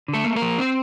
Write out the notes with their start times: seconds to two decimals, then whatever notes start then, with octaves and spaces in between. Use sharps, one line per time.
0.08 D3
0.13 A3 A4
0.25 A#3
0.36 A#3 A#4
0.42 F3
0.58 C4 C5